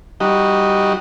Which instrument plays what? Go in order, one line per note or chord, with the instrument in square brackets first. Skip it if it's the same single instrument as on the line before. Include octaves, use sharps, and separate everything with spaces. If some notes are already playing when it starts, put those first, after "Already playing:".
[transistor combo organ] G3 D#4 F#4